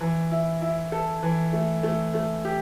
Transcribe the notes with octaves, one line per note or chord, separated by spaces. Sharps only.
E3
E4
E4
A4
E3
A3
A3
A3
G4